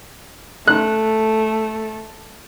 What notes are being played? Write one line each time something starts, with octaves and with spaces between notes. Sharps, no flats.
A3 F#6